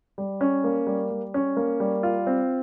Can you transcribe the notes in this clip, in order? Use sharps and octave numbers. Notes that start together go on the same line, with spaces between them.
G3
C#4
A#3
G3
G3
C#4
A#3
G3
F4
C4